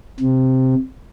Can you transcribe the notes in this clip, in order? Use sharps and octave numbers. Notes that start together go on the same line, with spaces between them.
C3